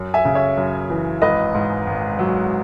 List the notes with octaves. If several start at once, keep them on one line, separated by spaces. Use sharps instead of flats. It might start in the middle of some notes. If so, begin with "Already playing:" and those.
Already playing: F#2
E5 G#5
C#3
C#5 E5
F#2
E3
G#1 B4 D#5
G#2
G#1
F#3